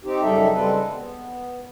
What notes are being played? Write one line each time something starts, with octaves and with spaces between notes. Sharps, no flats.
C4 D#4 G4
F#2 C#3 G3 D#4 A4 E5
C#3 G3 G#3 C4 A4 B4
B3